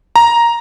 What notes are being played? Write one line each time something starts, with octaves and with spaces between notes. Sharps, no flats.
A#5